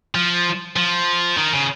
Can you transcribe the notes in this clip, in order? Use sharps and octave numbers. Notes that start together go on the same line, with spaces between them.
F3
F3
D#3
C#3